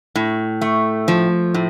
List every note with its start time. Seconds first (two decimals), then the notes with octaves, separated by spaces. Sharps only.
0.15 A2
0.62 A3
1.08 F3
1.54 A2